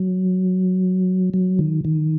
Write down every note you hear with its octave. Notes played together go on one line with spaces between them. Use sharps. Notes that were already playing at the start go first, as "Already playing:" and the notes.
Already playing: F#3
F#3
D#3
D#3